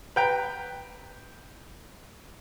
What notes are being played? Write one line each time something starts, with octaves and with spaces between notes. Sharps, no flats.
B4 G5 A#5